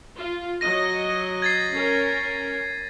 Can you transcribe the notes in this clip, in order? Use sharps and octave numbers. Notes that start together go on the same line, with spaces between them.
F4
F#3 D#5 A#6 D#7
G#6 A6 C7
C#4 A#4